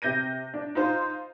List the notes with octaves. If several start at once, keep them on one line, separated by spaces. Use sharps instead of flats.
C3 G6 A#6 D#7
D4
D#4 F4 C5